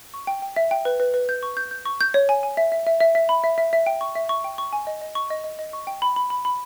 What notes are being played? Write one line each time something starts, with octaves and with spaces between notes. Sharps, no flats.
C#6
G5
G5
E5
G5
B4
B4
B4
G6
C#6
G6
G6
C#6
G6
C#5
G#5
G#5
E5
E5
E5
E5
E5
B5
E5
E5
E5
G5
C#6
E5
C#6
G5
C#6
G#5
D#5
D#5
C#6
D#5
D#5
D#5
C#6
G5
B5
B5
B5
B5